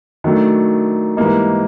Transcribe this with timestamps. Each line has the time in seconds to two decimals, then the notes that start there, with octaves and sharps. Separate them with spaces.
0.24 D#3 F#3 A3 D4
1.17 G#2 E3 G3 A#3 D#4